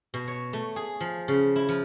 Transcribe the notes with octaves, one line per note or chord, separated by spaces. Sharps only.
B2
C#5
A3
G#4
F3
C#3
E4
F3